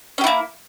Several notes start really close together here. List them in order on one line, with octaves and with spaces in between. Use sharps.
C#4 G4 E4 A#3